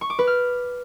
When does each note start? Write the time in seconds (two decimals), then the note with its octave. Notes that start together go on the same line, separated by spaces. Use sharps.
0.01 C#6
0.10 D6
0.19 B4
0.27 F6